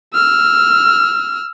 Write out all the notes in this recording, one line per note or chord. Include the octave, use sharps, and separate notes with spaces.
E6 F6